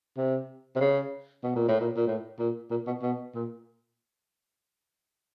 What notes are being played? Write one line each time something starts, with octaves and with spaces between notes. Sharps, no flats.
C3
C3
C#3
B2
A#2
A2
A#2
A#2
A2
A#2
A#2
B2
B2
A#2